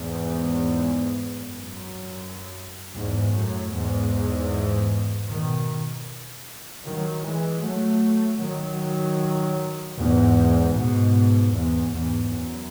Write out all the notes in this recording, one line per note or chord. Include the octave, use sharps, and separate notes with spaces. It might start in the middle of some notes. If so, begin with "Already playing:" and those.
Already playing: E2 G#2
F#2
E2 G#2
F#2 A2
E2 G#2
B2 D#3
D#3 F#3
E3 G#3
F#3 A3
D#3 F#3
E2 G#2
G#2 B2
E2 G#2
E2 G#2
F#2